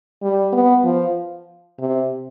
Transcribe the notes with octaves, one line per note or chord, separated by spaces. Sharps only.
G3
B3
F3
C3